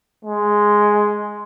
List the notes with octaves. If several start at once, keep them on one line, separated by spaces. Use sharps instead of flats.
G#3